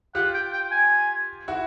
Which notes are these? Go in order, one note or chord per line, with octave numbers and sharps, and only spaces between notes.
F4 G4 F#5
G5
G5
G#5
E4 F#4